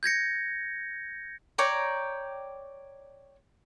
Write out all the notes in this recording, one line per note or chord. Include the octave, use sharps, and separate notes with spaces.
G6 G#6 A#6 C#7
C#5 D5 G5 A#5